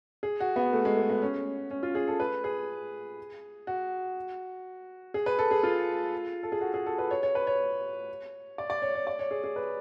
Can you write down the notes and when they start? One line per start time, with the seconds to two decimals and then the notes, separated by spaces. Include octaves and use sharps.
0.23 G#4
0.40 F#4
0.56 B3
0.73 A3
0.85 G#3
0.97 A3
1.10 B3
1.22 C#4
1.71 C#4
1.83 F4
1.95 G#4
2.08 A4
2.20 B4
2.44 G#4
3.67 F#4
5.14 G#4
5.26 B4
5.39 A4
5.51 G#4
5.63 F4
6.43 A4
6.52 G#4
6.61 F#4
6.74 G#4
6.86 A4
6.98 B4
7.11 C#5
7.23 C#5
7.35 B4
7.47 C#5
8.58 D5
8.70 D5
8.82 C#5
8.95 C#5
9.07 D5
9.19 C#5
9.31 G#4
9.44 G#4
9.56 B4